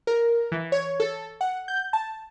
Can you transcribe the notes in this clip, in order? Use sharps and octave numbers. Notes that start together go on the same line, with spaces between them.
A#4
E3
C#5
A4
F#5
G6
A5